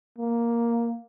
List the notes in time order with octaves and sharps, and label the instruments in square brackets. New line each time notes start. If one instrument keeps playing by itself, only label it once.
[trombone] A#3